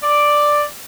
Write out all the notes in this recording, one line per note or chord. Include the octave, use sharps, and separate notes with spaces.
D5